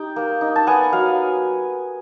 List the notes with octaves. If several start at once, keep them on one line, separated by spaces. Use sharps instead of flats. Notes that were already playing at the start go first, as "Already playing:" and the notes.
Already playing: D#4 G4 G5
A#3
D#4
A5
B3 F#5 G#5
F#3 F5